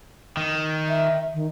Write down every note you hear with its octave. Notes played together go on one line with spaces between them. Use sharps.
D#3
E5
D#3